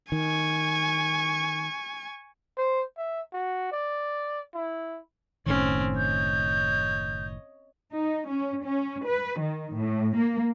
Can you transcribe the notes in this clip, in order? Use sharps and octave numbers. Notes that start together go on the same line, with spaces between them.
D#3 G#5 C#6
C5
E5
F#4
D5
E4
F#1 A2 D#3 C4 C#4
C#5 D#5 G6
D#4
C#4
C#4
B4
D#3
A2
A#3